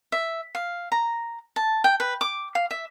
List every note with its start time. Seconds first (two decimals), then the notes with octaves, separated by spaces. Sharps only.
0.12 E5
0.55 F5
0.92 A#5
1.56 A5
1.84 G5
2.00 B4
2.21 D6
2.55 F5
2.71 E5